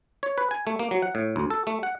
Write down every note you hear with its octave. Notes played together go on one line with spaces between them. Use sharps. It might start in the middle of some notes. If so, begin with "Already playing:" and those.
C#5
B4
G#5
A3
A#3
F#3
F#5
A2
D2
A4
A3
F#5